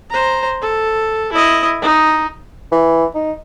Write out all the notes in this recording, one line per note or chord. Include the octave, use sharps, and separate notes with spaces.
C5 A#5
A4
E4 D#5
D#4
E3
D#4